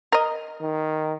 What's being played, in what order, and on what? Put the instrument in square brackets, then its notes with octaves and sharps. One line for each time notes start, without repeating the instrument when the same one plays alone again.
[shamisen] A#4 D#5
[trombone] D#3